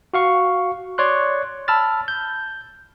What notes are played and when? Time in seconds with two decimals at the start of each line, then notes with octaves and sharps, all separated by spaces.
0.14 F#4 F5 C#6
0.98 C#5 D5 C6 F#6
1.68 A5 B5 E6 F6 A6
2.08 G6